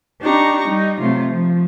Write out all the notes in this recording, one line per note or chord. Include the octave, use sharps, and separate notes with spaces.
D4 D#4 G4 A#5 C#6
G3 D#4
C3 F#3 A3 F4
F3